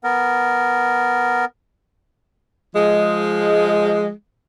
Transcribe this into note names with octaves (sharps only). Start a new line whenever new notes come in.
B3 A#4
F3 G#3